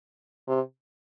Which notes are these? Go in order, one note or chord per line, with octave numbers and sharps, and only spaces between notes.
C3